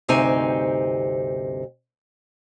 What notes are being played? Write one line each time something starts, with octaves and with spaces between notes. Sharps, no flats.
D2 G2 C3 C4 D#4 G#5